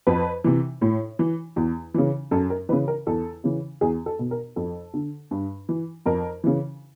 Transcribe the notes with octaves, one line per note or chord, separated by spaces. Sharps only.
F2 B4
C3 E3
A2
E3
E2
C#3 E3
F#2 A4
A#4
C#3 E3 B4
A#4
E2 A4
C#3 E3
E2 G#4
A4
B2
A#4
F2 A4
D3
G2
E3
F2 A#4
C#3 E3